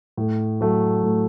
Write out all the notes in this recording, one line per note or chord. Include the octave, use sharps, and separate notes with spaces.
A2
F#3 A3
A2